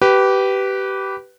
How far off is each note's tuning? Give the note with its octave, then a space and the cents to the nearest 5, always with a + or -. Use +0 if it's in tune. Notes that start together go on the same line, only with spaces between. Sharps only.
G4 -20 B4 +0